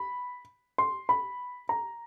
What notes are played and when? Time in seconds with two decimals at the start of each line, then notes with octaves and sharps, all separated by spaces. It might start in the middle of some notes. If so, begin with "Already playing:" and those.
Already playing: B5
0.78 C6
1.09 B5
1.69 A#5